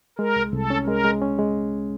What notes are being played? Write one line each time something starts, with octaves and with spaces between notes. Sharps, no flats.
G#3 A#4
C2
C2 A4
C#4
G#3 A#4
G#3
C#4
G#3